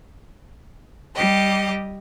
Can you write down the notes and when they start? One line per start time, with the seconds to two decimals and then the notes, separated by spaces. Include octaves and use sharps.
1.14 G3 G4 D#5